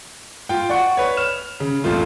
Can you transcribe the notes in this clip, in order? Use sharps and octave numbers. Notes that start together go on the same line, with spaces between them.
F4 G5
D5 F#5 C#6
B4 C#5
F6 E7
C#3
A1 F2 F3 A3 F4